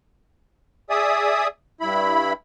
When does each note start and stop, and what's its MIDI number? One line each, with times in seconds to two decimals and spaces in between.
0.90 1.47 68
0.90 1.47 74
0.90 1.47 76
0.90 1.47 87
1.81 2.33 43
1.81 2.33 64
1.81 2.33 83